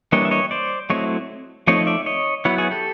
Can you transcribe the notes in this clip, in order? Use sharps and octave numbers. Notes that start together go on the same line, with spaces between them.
E3 G3 A#3 D4 C#5 D#5
E5
C#5 D#5
C5 D5
F#3 A3 C4 E4 C#5 D#5
F3 A3 C4 D#4 C#5 D#5
D5 E5
C#5 D#5
F#3 B3 E4 B4 C#5
F#4 G#4
G4 A4